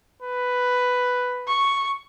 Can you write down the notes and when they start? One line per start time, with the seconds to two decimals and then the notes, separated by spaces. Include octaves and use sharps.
0.22 B4
1.48 C#6